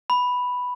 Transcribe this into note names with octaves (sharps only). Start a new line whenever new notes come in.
B5